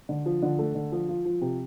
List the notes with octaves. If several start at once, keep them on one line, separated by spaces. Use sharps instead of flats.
D3
F3
D3
A3
D3
F3
F4
F3
C3